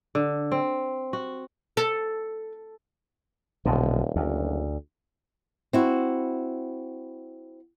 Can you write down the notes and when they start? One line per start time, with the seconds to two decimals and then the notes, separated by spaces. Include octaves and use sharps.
0.15 D3
0.52 C4
1.13 F#4
1.77 A4
3.65 D#1 B1 B2 D3
4.16 F#1 D2
5.73 C4 E4 F#4